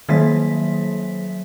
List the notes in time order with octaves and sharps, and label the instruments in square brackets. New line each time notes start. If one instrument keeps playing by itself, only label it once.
[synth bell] D#3 F#3 G3 A#3 E5 B6